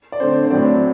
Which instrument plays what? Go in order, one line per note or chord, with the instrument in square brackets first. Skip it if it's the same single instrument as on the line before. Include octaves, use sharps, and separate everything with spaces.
[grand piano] D5
D3 A3 C4 C5
C5
A2 F#3 C4 D5